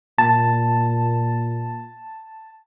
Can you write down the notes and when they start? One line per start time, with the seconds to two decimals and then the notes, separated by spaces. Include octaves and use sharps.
0.18 A#2 A5